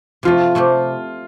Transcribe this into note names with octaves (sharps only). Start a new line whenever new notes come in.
C3 F3 A3 F4
C3 A3 C4 G4